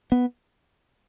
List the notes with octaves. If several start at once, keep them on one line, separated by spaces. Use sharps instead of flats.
B3